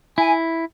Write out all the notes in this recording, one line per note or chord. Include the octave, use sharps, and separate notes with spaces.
E4 G#5